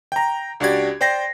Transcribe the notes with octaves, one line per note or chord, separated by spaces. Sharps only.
G5 A#5
C#2 D4 F#4 G4 D5 G#6
C5 D5 G5 A#6 C7